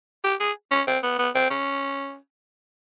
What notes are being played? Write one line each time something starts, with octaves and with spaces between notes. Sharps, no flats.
G4
G#4
C#4
C4
B3
B3
C4
C#4